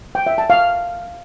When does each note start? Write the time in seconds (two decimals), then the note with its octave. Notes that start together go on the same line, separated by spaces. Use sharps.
0.15 G5
0.27 E5
0.38 A5
0.50 F5